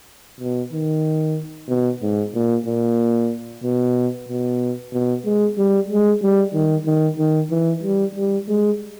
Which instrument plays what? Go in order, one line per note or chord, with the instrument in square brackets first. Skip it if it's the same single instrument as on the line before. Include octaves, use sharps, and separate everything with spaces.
[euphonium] B2
D#3
B2
G#2
A#2
A#2
B2
B2
B2
G#3
G3
G#3
G3
D#3
D#3
D#3
E3
G3
G3
G#3